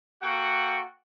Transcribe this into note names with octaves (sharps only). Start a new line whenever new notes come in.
A#3 F#4 A4 F#5 G5 C#6